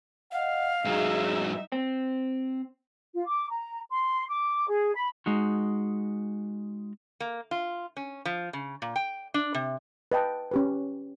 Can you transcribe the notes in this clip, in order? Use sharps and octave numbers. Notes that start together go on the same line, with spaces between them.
D#5 F5 F#5
G#2 F#3 D#4 G#4 E5
C4
F4
D6
A#5
C6
D6
G#4
B5
G#3 D#4 F#4
A#3
F4
C#4
F3
C#3
A#2
G5
D4
C3
B4 D#5 G5 A5
C#4 G4 B4